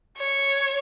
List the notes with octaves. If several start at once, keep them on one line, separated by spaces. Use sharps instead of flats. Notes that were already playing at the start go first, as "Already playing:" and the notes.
C#5